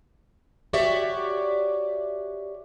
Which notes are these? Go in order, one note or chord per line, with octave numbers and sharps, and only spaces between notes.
F#4 G4 C#5 D5 E5